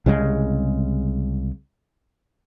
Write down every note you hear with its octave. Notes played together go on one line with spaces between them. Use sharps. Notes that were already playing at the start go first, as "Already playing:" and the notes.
C2 C#3 F#3 G#3